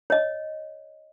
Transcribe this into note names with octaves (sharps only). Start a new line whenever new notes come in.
C#5 D#5